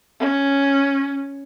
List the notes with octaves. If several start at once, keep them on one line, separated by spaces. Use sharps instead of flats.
C#4